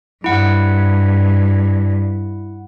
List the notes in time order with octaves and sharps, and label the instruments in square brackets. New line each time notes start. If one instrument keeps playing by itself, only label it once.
[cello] G2 [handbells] E4 F#5